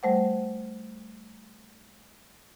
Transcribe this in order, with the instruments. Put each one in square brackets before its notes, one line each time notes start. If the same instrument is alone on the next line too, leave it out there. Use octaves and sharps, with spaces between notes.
[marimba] G3 A3 C5 F#5